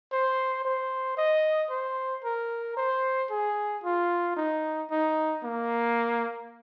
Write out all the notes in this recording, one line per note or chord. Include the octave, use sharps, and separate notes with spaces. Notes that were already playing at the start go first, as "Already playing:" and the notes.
C5
C5
D#5
C5
A#4
C5
G#4
F4
D#4
D#4
A#3